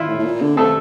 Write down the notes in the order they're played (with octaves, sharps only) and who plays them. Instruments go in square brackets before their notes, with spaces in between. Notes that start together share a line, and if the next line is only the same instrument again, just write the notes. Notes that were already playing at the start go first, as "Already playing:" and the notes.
Already playing: [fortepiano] E4 F4 E5
[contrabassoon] A2
A2
A#2
D3
[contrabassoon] C3 [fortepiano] A3 A4